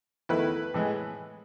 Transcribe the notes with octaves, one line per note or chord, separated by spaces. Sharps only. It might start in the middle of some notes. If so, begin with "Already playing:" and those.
E2 D#3 A3 E4 B4
A2 E3 G#3